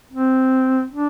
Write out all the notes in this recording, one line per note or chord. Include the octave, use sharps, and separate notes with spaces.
C4
D4